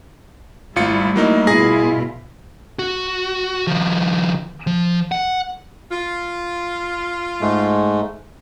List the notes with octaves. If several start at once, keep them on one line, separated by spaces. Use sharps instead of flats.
G#1 G3 A3 E4 F4 C#7
F#3 A#3 D#4
B2 E4 F4 G#4 G#5 A#6
F#4
D#3 F3
F3
F#5
F4
G#2 G#3 A3